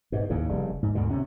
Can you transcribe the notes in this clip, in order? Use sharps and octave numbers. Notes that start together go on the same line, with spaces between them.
G#2 B2
D#2 A2 C#3
F1 C#3 G3
G#2
D2 G#2 B2 D3
C3 C#4